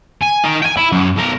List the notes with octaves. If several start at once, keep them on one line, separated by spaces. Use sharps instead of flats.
G#5
D#4 A#4
G5 G#5
E4
F#2
B1 A#4